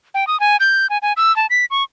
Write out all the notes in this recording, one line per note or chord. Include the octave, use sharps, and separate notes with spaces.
G5
D#6
G#5
G6
G#5
G#5
E6
A5
B6
C#6